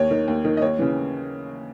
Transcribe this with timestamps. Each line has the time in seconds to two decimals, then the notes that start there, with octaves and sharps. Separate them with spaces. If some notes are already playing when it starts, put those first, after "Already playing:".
Already playing: D#2 C#5
0.11 D#3
0.28 D#2
0.45 D#3
0.57 D#5
0.62 D#2 C#5
0.79 C#3 E3